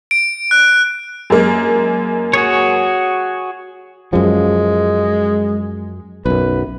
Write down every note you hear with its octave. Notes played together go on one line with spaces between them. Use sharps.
D7
F#6
F#2 G#3 A#3
F#4 G#4 C#5
F#2 F3 G#3
B1 F#2 B4